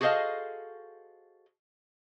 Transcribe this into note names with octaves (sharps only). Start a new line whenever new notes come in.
F#4 G#4 A4 C5 D#5 F5